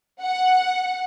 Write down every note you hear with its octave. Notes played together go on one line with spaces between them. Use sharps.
F#5